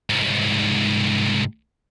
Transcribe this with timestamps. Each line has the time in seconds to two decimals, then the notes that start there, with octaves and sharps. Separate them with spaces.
0.10 C2 G#2